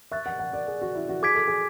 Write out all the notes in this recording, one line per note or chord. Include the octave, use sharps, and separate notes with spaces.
E5 C#6 F#6 A6
F#5
F#5
D5
G#4
F#4
E4
F#4
G#4 D6 G#6 B6 D7
A4
G#4